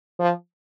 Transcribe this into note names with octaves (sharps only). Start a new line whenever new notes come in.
F3